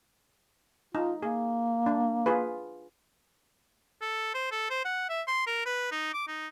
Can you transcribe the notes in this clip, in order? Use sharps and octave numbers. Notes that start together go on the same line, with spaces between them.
D#4 F4
A#3 G#4
D4
F4 G#4 B4
A4
C5
A4
C5
F#5
E5
C6
A#4
B4
D#4
D6
D#4